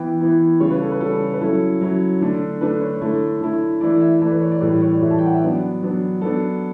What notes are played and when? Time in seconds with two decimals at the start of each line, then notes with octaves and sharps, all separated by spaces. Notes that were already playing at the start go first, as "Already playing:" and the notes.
Already playing: E3 B3 E4 G5
0.21 E3 B3 E4
0.60 C#3 G3 C#4 C#5
0.70 B4
0.81 A4
0.91 B4
1.00 C#3 G3 C#4 A4
1.33 B4
1.41 F#3 C#4 E4 A4
1.81 F#3 C#4 E4
2.21 D3 A3 D4
2.61 D3 A3 D4 B4
2.82 C#5
3.01 D3 A3 E4
3.41 D3 A3 E4
3.81 E3 A3 E4 D5
4.01 E5
4.22 E3 A3 E4 D5
4.31 B4
4.41 C#5
4.52 D5
4.61 A2 E3 G3 B4
4.82 C#5
4.92 D5
5.01 A2 E3 G3 E5
5.11 A5
5.18 G5
5.26 F#5
5.34 E5
5.42 F#3 B3 D4 D5
5.82 F#3 B3 D4
6.21 F#3 B3 D4 A4